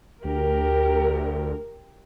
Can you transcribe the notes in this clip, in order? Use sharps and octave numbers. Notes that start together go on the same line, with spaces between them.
D2 G4 A#4